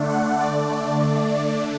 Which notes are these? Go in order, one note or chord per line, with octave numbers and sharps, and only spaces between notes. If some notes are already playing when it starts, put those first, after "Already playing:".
Already playing: D3 A3 D4
F#5
D5